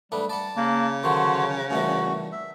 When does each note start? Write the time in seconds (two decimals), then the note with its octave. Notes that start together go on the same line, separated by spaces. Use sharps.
0.12 G#2 G3 A3 D4 B4
0.30 G3 D5 F#5 A5
0.57 C#3 A#3
1.03 D3 D#3 F3 F#3 F#4 C5 C#5
1.71 G2 A#2 E3 A3 F#4
2.32 E5